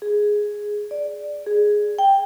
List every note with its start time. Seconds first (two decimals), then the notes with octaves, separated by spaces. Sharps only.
0.02 G#4
0.91 D5
1.46 G#4
1.99 G5